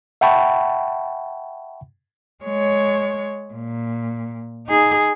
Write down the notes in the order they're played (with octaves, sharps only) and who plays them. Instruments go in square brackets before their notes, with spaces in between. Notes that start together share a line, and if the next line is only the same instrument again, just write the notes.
[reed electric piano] E5 F#5 G5 A5 B5 C#6
[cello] G#3 C#5
A#2
D#4 G#4